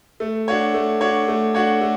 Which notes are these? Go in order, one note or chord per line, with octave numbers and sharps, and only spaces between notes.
A3
D4 F#4 C#5
A3
D4 F#4 C#5
A3
D4 F#4 C#5
A3